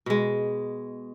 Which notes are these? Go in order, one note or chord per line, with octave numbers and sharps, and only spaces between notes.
B2 G#3